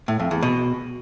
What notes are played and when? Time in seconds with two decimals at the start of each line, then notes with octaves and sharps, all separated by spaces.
0.08 A2
0.20 F2
0.31 E2
0.43 B2